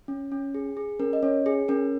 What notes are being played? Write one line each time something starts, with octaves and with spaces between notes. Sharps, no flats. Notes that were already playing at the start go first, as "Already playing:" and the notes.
C#4
C#4
G#4
G#4
C#4 A#4
D#5
C#4 C#5
G#4
C#4 A#4